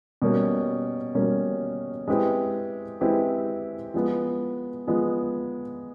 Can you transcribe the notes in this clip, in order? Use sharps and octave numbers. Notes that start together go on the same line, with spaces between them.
B2 G3 A#3 C#4
B2 G3 A#3 C#4
G#3 C4 E4 G4 B4
G#3 C4 E4 G4 B4
F3 G#3 B3
F3 G#3 B3